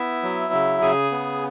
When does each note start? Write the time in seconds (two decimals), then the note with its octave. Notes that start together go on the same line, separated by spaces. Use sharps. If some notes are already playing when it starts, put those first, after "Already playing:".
Already playing: B3 E4 E5
0.23 F#3
0.53 C#3
0.81 C#3 G#4 G#5
1.11 B3